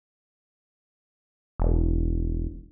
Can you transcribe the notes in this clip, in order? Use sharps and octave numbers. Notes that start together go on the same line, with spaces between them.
E1